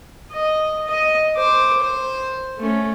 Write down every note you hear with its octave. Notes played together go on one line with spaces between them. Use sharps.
D#5
D#5
C5 D6
C5
A3 C#4